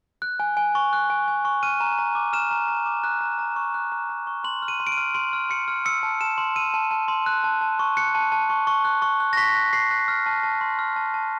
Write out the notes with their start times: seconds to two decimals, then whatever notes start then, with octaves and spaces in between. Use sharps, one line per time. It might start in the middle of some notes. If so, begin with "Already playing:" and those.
0.22 F#6
0.40 G#5
0.57 G#5
0.75 C#6
0.93 F#6
1.10 G#5
1.28 G#5
1.45 C#6
1.63 F6 D#7
1.80 A#5
1.99 A#5
2.15 D6
2.33 F6 E7
2.51 A#5
2.68 A#5
2.86 D6
3.04 F#6
3.21 A#5
3.39 A#5
3.56 C#6
3.74 F#6
3.92 A#5
4.10 A#5
4.27 C#6
4.44 C6 F#7
4.62 F6
4.68 D#7
4.80 C6
4.87 D7
4.92 D#7
4.98 F6
5.15 C6 D7
5.33 F6
5.50 C6 C#7
5.68 F6
5.85 E6 C#7
6.03 A5
6.21 A5 E7
6.38 C6
6.55 E6 D#7
6.74 A5
6.91 A5
7.08 C6
7.26 F#6
7.44 A5
7.61 A5
7.79 C#6
7.97 F#6 C#7
8.15 A5
8.32 A5
8.50 C#6
8.67 C#6
8.85 F#6
9.02 C#6
9.20 F#6
9.33 A#6
9.37 C#6 B6
9.55 F#6
9.73 C#6 C7
9.91 F#6
10.08 F6
10.26 A5
10.43 A5
10.61 C6
10.79 F6
10.96 A5
11.14 A5